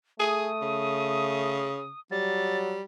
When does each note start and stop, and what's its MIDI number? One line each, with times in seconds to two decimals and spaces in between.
0.20 1.70 57
0.20 0.49 68
0.20 2.00 87
0.62 1.89 49
2.11 2.77 54
2.11 2.82 55
2.11 2.58 93